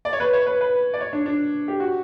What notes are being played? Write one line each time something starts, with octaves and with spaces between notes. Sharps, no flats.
D5
C#5
B4
C#5
B4
B4
D5
C#5
D4
D4
G4
F#4